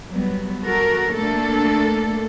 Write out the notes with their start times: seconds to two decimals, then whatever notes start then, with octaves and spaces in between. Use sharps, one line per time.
0.11 F#3 G3 B3
0.64 F#4 A4 A#4
1.15 A3 A#3 D4 A4